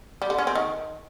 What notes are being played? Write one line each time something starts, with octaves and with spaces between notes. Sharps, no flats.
G3
D3
C#4
C4
D#3